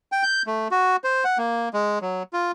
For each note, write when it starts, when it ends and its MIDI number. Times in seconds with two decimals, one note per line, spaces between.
0.12 0.23 79
0.23 0.42 91
0.47 0.68 57
0.71 0.96 66
1.04 1.24 72
1.24 1.38 78
1.38 1.69 58
1.74 1.99 56
2.02 2.23 54
2.33 2.52 65